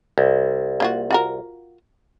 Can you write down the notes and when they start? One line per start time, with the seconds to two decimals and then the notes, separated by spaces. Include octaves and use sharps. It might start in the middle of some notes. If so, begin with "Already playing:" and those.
0.18 C2
0.80 A#3 F4 F#4
1.11 F4 F#4 A#4